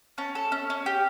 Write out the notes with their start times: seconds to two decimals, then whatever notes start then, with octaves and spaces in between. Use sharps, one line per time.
0.18 C#4 A5
0.35 A4
0.52 C#4
0.70 C#4
0.86 G4